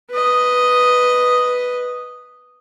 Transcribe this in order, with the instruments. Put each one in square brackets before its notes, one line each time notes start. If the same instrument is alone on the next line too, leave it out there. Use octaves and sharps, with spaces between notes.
[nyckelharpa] B4 D#5